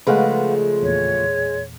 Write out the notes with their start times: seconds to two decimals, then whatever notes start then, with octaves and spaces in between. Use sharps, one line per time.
0.07 C#3 F3 G#3 A3 B4 F5 F#5
0.83 E2 A#2 C#5